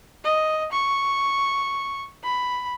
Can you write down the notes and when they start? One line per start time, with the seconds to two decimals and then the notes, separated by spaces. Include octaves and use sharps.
0.24 D#5
0.73 C#6
2.24 B5